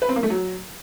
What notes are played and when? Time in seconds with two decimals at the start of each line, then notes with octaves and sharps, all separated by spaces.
0.02 B4
0.09 C4
0.16 A#3
0.23 A3
0.30 F#3